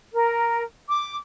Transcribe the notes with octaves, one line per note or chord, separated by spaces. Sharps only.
A#4
D6